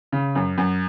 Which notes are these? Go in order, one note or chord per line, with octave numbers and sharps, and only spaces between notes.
C#3
F#2
F#2